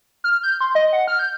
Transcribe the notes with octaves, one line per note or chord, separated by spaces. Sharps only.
F6
G6
C6
D#5
F#5
F6
G6